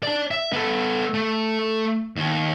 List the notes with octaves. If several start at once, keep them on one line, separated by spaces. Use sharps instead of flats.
D5 A5
E5
B3 A4
A3
D#2